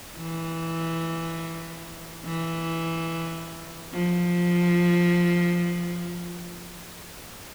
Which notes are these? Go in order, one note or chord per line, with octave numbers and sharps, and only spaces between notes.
E3
E3
F3